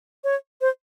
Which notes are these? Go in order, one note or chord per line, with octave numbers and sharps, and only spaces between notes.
C#5
C5